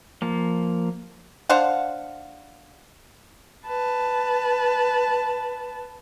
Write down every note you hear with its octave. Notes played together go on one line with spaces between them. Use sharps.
F3 A#3
D4 C5 F5 F#5
B4 A5